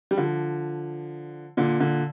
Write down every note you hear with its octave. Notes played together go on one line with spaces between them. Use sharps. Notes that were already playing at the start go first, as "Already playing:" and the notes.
G3
D3 F3
A#2 D3
A#2 D3